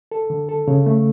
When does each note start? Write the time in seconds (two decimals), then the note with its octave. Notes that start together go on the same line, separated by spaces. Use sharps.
0.12 A4
0.30 D3
0.49 A4
0.68 C#3
0.86 A3